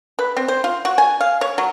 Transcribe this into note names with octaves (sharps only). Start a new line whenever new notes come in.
B4
C4
C5
F4
F#4
G#5
F5
C#5
F#3